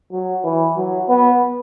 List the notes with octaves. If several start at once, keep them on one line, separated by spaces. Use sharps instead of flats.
F#3
E3
F#3
B3